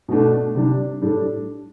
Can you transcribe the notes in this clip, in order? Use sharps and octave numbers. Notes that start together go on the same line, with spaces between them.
B2 A3 D4
C3 G3 D4
A2 G3 D4 A4